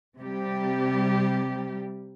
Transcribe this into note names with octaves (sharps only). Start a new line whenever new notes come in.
C3 G3 G4